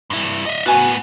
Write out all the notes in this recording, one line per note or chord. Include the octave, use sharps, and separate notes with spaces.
G2 E4
D#5 E5
A2 B3 F#4 G#5